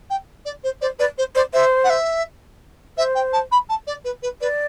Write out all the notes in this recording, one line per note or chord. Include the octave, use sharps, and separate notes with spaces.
G5
D5
C5
C5 D5
B4 D5
C5
C5 D5
C5 E5
F#5
E5
C5 E5
G5
A5
B5
A5
D5
B4
B4
B4 D5